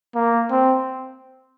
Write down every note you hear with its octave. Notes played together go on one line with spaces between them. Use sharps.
A#3
C4